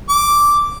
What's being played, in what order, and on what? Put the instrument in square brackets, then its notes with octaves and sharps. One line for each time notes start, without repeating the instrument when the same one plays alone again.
[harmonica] D6